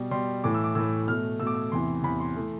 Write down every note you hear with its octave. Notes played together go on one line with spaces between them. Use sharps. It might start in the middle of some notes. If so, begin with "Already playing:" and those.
Already playing: B2 G3
B2 G3 C6
A2 E3 A3 D6
E6
D6
A2 E3 A3 E6
B2 A3 F6
B2 A3 E6
D6
E6
E2 C3 E3 C6
E2 C3 E3 B5
C6
E3 A3